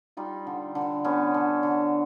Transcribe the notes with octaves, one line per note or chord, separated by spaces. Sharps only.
G3 D#4 F4
D3
D3
D3 B3 C#4
D3
D3